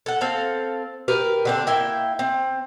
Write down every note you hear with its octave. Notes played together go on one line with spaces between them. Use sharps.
A4 F#5
C4 A4 F5
G4 A#4 B4
D3 C4 D4
A#3 E4 G5
C4